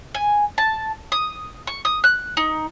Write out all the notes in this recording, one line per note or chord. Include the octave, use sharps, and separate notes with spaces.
G#5
A5
D#6
C#6
D#6
F#6
D#4